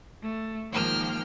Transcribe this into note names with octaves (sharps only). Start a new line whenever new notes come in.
A3
G#2 D#3 F3 A#3 G5 F6